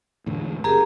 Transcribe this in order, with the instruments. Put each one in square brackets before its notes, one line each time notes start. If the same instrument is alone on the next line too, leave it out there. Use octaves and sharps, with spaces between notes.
[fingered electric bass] E2 A2 D3
[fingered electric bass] F#1 [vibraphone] G4 G#4 A#4 [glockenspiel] A#5